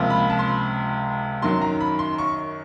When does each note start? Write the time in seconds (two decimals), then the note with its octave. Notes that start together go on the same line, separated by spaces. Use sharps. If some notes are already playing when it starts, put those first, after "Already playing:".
Already playing: C#2 C3 F3 A#3
0.10 B5
0.30 A5
0.39 C6
0.48 B5
1.42 F#2 D#3 F#3 C6
1.62 A#5
1.81 B5
1.99 C6
2.18 C#6